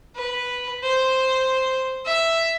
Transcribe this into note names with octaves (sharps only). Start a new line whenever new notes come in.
B4
C5
E5